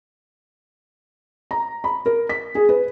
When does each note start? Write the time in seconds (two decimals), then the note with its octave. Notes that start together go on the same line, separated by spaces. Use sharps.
1.51 A#5
1.84 B5
2.06 A#4
2.29 B6
2.55 G#4
2.69 B4